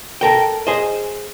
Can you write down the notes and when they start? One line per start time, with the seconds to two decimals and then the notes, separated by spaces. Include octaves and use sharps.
0.21 A4 A#4 G5
0.67 G#4 C5 D#5